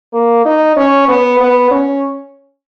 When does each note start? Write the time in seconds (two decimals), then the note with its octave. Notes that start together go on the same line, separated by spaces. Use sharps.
0.13 A#3
0.45 D#4
0.76 C#4
1.08 B3
1.40 B3
1.71 C#4